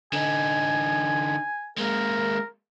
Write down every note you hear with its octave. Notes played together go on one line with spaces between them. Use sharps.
D3 D#4 G#5
G#3 A#3 A#4